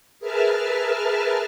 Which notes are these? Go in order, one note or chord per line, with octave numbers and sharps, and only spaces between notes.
G#4 A#4 B4 E5 A5 F6